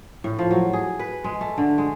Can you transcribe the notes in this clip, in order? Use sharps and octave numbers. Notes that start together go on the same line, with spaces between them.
A2
F3
F#3
G#4
B4
G#3
A3
D3
G#3